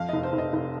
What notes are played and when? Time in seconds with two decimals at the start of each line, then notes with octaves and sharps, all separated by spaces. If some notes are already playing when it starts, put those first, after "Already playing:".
Already playing: F2 F5
0.09 F1 D#5
0.23 C5
0.33 F1
0.38 D#5
0.53 F1